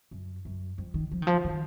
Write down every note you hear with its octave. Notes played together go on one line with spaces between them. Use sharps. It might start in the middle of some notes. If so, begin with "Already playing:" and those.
F#2
F#2
F2
D#3
F3
D#3
F3
D#3